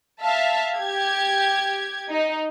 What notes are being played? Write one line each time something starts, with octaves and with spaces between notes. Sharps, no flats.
E5 F5 A5
G4 G#6
D#4